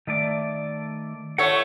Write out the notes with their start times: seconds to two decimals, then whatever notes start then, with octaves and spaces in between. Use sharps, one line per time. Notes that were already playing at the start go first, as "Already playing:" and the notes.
0.07 D#3 A3 D5
1.38 A3 F4 A4 C#5 F#5